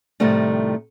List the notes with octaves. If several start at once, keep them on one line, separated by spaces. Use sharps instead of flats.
A2 C3 D#3 F3 G3 A3